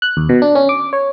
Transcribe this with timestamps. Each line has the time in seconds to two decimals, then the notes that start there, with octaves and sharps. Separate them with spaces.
0.02 F#6
0.17 D#2
0.29 B2
0.42 D4
0.55 C#4
0.69 D6
0.93 C#5